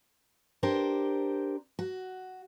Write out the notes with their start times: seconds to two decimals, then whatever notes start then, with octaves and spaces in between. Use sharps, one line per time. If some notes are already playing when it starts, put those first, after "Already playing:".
0.63 D4 G4 A#4 C5
1.79 F#4